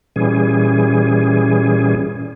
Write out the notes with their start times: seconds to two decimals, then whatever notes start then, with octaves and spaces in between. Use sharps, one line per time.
0.16 A#2 E3 G3 C#4 G#4